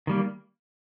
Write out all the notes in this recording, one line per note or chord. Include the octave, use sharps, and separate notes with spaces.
D#3 G3 A#3